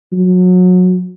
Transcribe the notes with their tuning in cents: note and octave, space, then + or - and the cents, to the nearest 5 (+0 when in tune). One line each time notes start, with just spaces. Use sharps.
F#3 -25